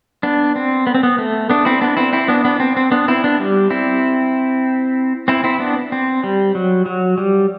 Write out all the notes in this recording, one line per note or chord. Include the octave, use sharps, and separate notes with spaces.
B3 D4
C4
B3
C4
B3
A3
B3 D4
C4 E4
B3 D4
C4 E4
C4 E4
B3 D4
B3 D4
C4
C4
B3 D4
C4 E4
B3 D4
G3
C4 E4
C4 E4
C4 E4
B3 D4
C4
G3
F#3
F#3
G3